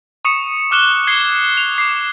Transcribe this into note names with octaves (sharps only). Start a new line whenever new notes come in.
C#6 D#6 C#7 E7
D6 F6 F#6 E7 G7
G#6 C7 G7
F7
D6 C7